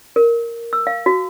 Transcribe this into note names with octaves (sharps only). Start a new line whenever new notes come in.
A#4
E6
F5
F#4